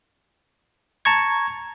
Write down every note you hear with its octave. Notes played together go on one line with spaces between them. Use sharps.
A5 A#5 C#6 G#6